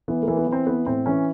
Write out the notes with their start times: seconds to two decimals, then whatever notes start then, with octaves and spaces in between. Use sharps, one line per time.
0.08 E3 B3
0.23 A#3
0.28 E3
0.37 B3
0.47 E3
0.52 C4
0.67 E3 B3
0.86 A2 C4
1.06 E3 C#4